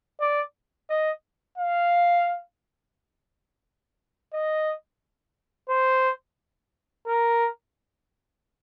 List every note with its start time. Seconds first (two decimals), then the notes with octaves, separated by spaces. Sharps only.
0.21 D5
0.90 D#5
1.58 F5
4.33 D#5
5.69 C5
7.07 A#4